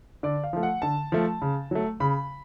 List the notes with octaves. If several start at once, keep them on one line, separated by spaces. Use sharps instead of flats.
D3 D5
F5
F3 A3
F#5
D3 A5
F3 A3
C#3
F#3 A3
C#3 B5